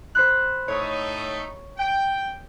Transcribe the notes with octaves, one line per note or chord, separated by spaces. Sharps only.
C5 B5 F#6
A2 A3 D#4 C#5
G5